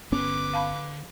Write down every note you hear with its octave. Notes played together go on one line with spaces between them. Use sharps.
G1 D3 B3 C#4 B4 C6 D6
F5 A5 B5